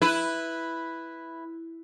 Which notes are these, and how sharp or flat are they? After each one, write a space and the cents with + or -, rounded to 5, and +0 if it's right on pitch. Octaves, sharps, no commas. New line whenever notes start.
E4 +0 B4 +0